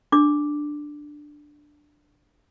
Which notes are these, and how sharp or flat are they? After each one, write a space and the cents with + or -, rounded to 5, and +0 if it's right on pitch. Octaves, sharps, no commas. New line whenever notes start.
D4 +10 D6 +0